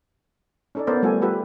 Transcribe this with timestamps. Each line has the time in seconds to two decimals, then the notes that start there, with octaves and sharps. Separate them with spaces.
0.75 C#4 D#4 A4 C#5 D5
0.87 B3 A4 A#4 C5 D5
1.02 G3 A3 F4 A4 F#5 G#5
1.21 F4 G4 A4 B4 F#5